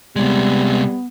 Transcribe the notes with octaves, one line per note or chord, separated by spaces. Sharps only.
C3 G3 G#3 B3